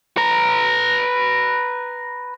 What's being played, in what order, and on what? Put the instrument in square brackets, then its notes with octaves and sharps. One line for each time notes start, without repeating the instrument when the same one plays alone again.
[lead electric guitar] B4 A#5